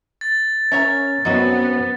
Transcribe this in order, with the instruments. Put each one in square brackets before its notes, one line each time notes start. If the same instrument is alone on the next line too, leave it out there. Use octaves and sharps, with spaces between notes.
[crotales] A6
[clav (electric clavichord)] C#4 [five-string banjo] A#4 C#5 E5
[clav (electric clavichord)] F#2 F#3 C4 [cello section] B3 [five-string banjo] D#4 F#4